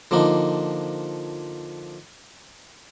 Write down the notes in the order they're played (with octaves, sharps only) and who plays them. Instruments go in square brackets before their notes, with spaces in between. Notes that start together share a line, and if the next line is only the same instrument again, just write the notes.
[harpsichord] D3 F3 A#3 D4 D#4